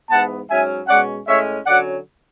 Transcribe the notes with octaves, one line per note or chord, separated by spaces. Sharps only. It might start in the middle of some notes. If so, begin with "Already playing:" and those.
G#2 E3 B3 F#5 A5
G#2 F#3 C#4 E5 G#5
B2 G#3 C#4 D5 F#5
A2 G#3 C#4 C#5 E5
D3 F#3 C#4 D5 F#5